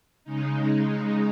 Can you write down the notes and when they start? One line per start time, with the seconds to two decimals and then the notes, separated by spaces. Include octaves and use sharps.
0.24 C#3 G#3 D#4